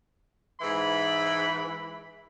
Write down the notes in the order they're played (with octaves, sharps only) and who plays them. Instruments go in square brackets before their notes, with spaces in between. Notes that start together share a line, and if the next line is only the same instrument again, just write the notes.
[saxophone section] G#2 E3 [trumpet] B5